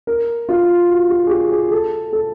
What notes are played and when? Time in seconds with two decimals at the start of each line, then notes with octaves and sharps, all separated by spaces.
0.07 A#4
0.49 F4
0.89 F#4
1.10 G4
1.26 G#4
1.30 G4
1.52 G#4
1.71 A4
2.13 A4